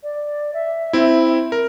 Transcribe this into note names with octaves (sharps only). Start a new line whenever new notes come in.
D5
E5
C4 E4
A#4